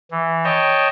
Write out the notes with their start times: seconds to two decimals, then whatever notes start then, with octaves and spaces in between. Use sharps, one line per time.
0.11 E3
0.44 C#5 D#5 G5 A5